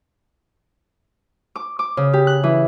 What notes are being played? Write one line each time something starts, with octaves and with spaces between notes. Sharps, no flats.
D6
D6
C#3
G4
F#6
E3